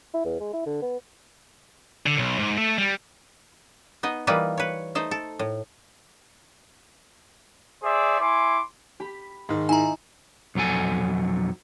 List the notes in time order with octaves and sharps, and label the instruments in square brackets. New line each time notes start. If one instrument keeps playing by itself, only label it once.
[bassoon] E4
E2
G#3
E4
D3
B3
[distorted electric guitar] D3
B1
G#2
A3
G3
[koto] B3 D#4 D#5
E3 G3 A#3 D#4 F4 B4
B4 C#5
A3 D#4 C5
A4
A2
[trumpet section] G#4 C5 D5 E5
E4 G#5 C6 D6
[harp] G4 B5
[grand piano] G#2 D#3
[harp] D#4 E4 [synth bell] G#5 A#5
[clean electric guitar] B1 F2 F#3 A4 G#5